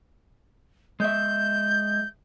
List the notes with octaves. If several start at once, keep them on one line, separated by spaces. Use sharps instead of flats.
G#3 E5 G6